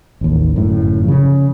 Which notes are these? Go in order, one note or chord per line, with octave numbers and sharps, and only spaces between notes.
A1 D#2
G1 F#2 A2
C#3 F3